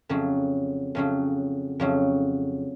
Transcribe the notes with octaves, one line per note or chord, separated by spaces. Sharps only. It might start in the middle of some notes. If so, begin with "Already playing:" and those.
F2 C#3 F#3
F2 C#3 F#3
F2 C#3 F#3